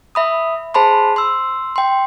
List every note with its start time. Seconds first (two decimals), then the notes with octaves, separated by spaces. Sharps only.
0.15 E5 B5 D#6
0.74 G#4 C5 A5 B5 C6
1.16 C6 E6
1.76 G5 C6